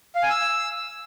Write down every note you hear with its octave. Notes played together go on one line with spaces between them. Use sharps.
F5
G#5
E6